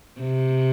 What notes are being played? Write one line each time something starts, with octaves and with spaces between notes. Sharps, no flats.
C3